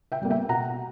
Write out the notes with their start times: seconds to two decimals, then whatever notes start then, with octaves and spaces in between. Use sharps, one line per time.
0.12 E5 G5
0.22 G3 A#3
0.31 E5 G5
0.49 B2 F#5 A#5